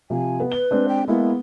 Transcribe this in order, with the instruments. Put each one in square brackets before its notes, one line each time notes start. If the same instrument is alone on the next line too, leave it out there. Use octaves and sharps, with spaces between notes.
[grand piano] C3 F3 [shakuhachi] G#5
[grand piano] B3
[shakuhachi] B4 [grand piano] G7
[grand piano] G#3 C4 D4
[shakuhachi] G5
[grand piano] G#3 A#3 E4 [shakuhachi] B3